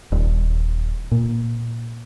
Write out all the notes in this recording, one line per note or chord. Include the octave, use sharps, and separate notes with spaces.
D#1
A#2